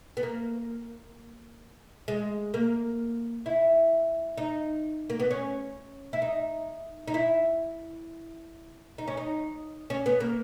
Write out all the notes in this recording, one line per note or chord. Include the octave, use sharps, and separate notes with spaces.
B3
A#3
G#3
A#3
E4
D#4
A#3
B3
C#4
E4
D#4
D#4
E4
D#4
C#4
D#4
C#4
B3
A#3